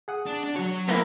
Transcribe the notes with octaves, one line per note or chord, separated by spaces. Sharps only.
G#4 F#5 D#6
D4
D4
F#3 F#4 C#5
A#3 B3 E4 A#4